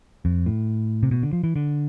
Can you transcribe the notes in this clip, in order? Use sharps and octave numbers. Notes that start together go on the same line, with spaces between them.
F2
A2
C3
B2
D3
F3
E3
D3